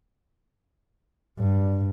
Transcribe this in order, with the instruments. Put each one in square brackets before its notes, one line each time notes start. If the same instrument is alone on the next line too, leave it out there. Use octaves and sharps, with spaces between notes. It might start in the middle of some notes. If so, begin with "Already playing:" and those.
[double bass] G2